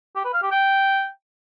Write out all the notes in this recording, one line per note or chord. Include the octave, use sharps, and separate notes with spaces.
G4
B4
F5
G4
G5